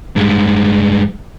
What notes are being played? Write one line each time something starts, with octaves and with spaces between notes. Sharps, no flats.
G2 G#3